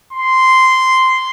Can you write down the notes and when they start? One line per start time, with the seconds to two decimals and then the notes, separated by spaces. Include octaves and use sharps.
0.13 C6